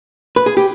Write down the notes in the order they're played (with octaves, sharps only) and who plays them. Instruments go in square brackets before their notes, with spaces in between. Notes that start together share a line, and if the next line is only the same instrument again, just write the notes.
[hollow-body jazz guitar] B4
G#4
G4